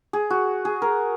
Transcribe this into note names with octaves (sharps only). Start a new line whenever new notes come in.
G#4
F#4
G#4
A#4